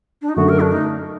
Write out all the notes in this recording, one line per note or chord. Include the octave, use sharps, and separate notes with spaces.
D4
D#4
F#2 D3 A3 F#4
A#4
D4
D#4